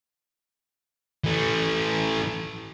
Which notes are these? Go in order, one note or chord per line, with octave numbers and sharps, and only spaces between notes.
E3 A3